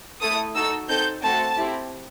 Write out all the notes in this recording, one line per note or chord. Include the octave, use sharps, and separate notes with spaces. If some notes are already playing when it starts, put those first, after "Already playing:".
A3 E4 A4 D#6
D#4 F#4 A4 E6
C4 D#4 A4 G6
A3 C4 F#4 A4 A5
C4 E4 G4